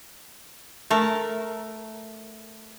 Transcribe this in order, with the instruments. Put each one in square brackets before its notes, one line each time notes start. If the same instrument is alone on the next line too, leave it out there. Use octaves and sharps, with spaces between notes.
[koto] A3 A#4